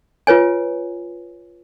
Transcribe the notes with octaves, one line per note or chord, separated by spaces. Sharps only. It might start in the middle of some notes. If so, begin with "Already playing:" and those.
F4 B4 C#5 G#5